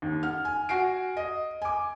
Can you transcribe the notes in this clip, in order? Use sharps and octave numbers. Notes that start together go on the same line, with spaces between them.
D#2
F#5 F6
G#5
F#4 G#5 C7 D7
D#5
G#5 D6